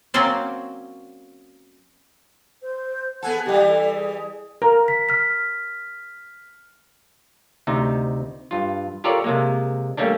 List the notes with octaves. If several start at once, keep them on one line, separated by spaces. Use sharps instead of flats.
F#3 A#3 C4 C#4 C5 D5
C5
B3 G#4 A4 F#5
E3 G3 G4
A4
G#4
A#4
B6
F6 B6
D2 C3 D#4
G2 F4
F4 G4 A4 A#4 C#5 D5
C3 G#3 A#3
G3 A3 A#3 C#4 D4